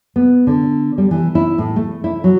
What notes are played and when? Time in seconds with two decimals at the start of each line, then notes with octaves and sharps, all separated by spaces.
0.16 B3
0.47 D3
0.98 G3
1.11 E3
1.35 E4
1.58 A2
1.76 A3
2.04 E4
2.24 F#3